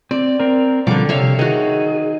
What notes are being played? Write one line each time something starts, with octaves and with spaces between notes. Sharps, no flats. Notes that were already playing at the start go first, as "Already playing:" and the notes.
C4 D5
C4 A#4
B2 D3 F3 G3 D6
C3 C#5 E5 F5
D#3 F#4 G#4